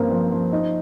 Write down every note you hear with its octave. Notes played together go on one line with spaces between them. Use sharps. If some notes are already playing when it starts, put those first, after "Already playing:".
Already playing: G2 F3 A#3 C4
F3
F3
D#4